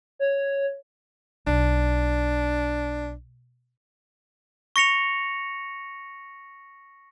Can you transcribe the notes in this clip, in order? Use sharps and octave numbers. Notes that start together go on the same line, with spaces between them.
C#5
B1 D4
C#6 A#6 C#7 F7